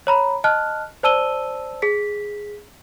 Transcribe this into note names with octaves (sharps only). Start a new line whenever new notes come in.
C#5 A#5 B5
D#5 A5 F6 F#6
C5 D5 A5 E6 D#7 G7
G#4 B6